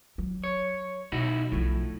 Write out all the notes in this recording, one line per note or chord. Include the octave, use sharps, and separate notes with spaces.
F#3
C#5
B2 D#4 E4 F#4
B1 A2 F3